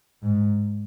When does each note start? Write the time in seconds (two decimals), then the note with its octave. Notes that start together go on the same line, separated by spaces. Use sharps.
0.23 G#2